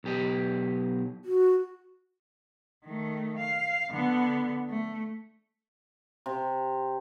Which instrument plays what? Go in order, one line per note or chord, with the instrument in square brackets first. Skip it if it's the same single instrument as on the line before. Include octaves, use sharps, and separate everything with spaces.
[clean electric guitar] B1 G4 D#5
[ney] F#4
[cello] D#3 A3
F5
D3 B3
A3
[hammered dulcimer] C3